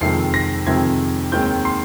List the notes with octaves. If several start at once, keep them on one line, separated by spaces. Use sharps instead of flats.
F2 C3 D#3 G#3 C4 C7
A#6
F2 C3 D#3 G#3 C4 G#6
D#2 D#3 G#3 C4 G6
C6